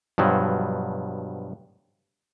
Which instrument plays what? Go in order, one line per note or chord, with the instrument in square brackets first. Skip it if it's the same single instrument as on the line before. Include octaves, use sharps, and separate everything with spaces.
[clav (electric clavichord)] G2 B2 F3 F#3